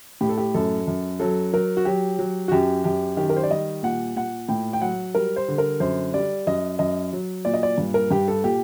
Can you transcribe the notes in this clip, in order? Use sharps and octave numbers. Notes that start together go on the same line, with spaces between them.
A2 G4
A4
G4
F#2 A4
F#2
F#3 A4
F#3 A#4
F#4
F#3 G4
F#3
F#4
F#2 G4
F#2 G4
D#3 G4
A#4
C5
D5
G3 D#5
A#2 F#5
A#2 F#5
A2 G5
G5
F#3 F#5
G3 A#4
C5
D3
A#4
F#2 C5
G3 D5
F#2 D#5
F#2 D#5
F#3
A#2 D5
D#5
D5
G2
A#4
G2 G4
A4
A#2 G4